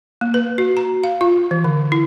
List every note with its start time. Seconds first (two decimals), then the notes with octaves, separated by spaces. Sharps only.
0.21 A#3
0.34 B4
0.58 F#4
0.77 A#5
1.04 F5
1.21 F4
1.51 E3
1.64 D3
1.92 E4